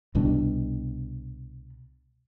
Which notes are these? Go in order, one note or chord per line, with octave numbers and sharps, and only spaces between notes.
C2 B2 G3 D4